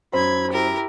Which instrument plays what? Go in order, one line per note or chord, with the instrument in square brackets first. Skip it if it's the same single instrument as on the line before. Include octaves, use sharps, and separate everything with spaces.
[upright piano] F#2 [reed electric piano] C5 [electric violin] B5 G#6
[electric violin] E4 G4 [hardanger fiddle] A#4